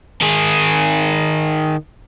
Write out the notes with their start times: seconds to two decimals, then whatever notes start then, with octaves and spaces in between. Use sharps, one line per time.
0.21 D#3 G#4